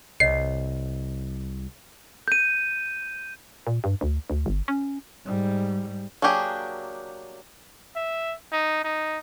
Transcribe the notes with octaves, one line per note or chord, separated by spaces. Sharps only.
C2 C#5 D#5 C7
G6 D#7
A#2
G2
D2
D2
G1
C#4
G#2 G3
F#3 A#3 D4 G4 G#4
E5
D#4
D#4